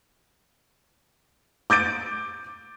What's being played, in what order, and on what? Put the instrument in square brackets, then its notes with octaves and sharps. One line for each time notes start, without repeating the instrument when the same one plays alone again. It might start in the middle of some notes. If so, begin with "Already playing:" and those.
[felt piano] D6 G6 A6 D7